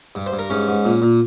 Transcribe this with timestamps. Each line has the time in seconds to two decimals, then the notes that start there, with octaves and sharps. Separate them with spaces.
0.15 G2
0.26 C5
0.32 G2
0.39 A#4
0.50 G#2 C#4
0.67 G#2
0.85 A#2
1.02 A#2